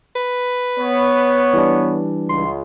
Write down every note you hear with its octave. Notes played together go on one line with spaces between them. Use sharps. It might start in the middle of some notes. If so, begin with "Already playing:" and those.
B4
B3 C#5
E3 G3 D4
C#2 C6